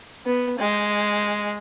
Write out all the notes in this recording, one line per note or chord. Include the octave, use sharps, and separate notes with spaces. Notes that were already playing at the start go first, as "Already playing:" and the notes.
B3
G#3